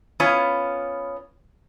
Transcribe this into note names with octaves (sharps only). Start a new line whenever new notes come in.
B3 C#4 F4